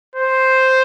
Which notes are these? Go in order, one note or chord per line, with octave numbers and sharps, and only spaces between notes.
C5